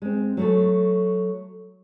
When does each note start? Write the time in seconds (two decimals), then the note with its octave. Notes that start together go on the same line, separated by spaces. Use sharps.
0.02 G#3 C4
0.37 F#3 A3 A4